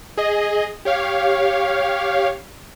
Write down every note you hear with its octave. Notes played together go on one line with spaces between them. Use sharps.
G#4 D#5
G4 C#5 F5